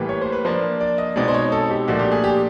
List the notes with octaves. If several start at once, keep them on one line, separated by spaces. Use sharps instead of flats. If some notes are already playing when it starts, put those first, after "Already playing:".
Already playing: A2 E3 G3 A#3
C#5
C5
B4
F3 A#3 D4 C5
D5
D#5
B2 G#3 C4 D#4 D5
C5
C#5
A4
G4
A#2 F3 A3 D4 F#4
G4
G#4
G4